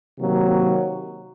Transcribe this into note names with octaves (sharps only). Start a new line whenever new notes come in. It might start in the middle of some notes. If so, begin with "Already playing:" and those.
C3 D#3 F#3 A#3